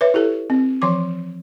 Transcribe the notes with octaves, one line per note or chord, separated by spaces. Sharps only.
B4 C#5 E5
E4 G4 A4
C4
E3 F3 C6 D6